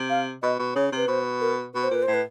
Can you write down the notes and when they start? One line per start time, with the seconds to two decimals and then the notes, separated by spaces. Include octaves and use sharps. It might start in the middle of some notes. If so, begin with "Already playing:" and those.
Already playing: C3
0.10 F5
0.43 B2 D#5
0.59 B2
0.75 C#3 C#5
0.92 C3 B4
1.08 B2 C5
1.41 A#4
1.74 B2 B4
1.84 C5
1.90 A#2 B4
2.03 A2 C5
2.14 B4